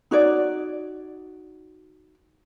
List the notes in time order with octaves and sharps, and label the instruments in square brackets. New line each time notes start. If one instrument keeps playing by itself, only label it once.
[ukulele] D#4 F#4 C#5 D5